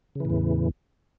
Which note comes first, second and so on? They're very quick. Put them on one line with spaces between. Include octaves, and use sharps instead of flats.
C#3 E3 A2 E2